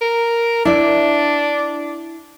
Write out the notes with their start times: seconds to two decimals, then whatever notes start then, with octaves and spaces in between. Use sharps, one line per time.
0.01 A#4
0.65 D4 E4 D5